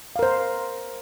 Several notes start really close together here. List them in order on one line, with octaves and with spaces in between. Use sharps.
F5 A#4 C5